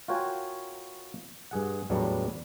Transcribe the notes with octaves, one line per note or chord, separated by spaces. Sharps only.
F4 F#4 A#4 C#5 G5 G#5
G2 G#4 F#5
E2 A2 F#3 G3 B3 D4